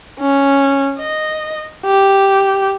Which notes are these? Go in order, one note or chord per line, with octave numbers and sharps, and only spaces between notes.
C#4
D#5
G4